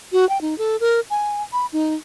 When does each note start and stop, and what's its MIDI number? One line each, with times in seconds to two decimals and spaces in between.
0.12 0.28 66
0.29 0.40 79
0.41 0.57 63
0.58 0.76 69
0.80 1.00 70
1.10 1.42 80
1.53 1.66 83
1.73 1.95 63